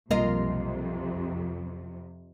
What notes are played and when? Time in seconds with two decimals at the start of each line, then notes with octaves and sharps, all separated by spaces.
0.11 B1 F2 C3 G3 A#3 F4 A#4 D#5